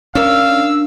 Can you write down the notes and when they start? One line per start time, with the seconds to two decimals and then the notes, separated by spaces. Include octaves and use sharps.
0.15 C#4 D4 A#4 F5 E6